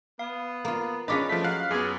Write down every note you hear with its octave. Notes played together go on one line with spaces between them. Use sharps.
B3 F5
A#3 F4
C#4 D4 F4 G#4 B4 D#5 D6 B6
F3 A3 B6
F#3 F5 F6 F#6
F#2 B3 G#4 D6